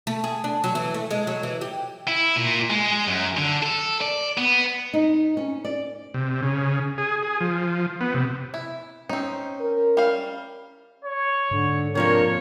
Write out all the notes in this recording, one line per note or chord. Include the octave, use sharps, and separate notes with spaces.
A3
G#4
D4
F#3
E3
A3
G#3
F#3
E3
G4
E4
A#2
G#3
F#2
D3
A4
D5
B3
D#4
C#4
D5
C3
C#3
G#4
G#4
F3
B3
C3
E4
C4 C#4 D#4
A#4
G3 F5
C#5
G#2 D3
C3 F3 A#3 D4 A#4 C#5